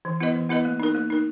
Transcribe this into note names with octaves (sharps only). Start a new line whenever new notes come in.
E3
B3 E4 B4 D#5
E3
B3 E4 B4 D#5
A#3
D#4 A#4
A#3
D#4 A#4